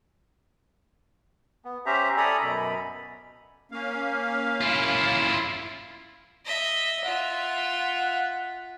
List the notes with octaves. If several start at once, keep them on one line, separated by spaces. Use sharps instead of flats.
B3
C#4 G4 C5 E5 A#5
A4 D5 G#5 A#5 B5 D#6
F#2 B2 B5
A#3 C#4 F5
E4 F4
D#5 E5
F4 E5 F#5